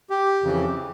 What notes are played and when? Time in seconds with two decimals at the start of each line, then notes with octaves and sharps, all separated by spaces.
0.10 G4
0.43 F2 C#3 E3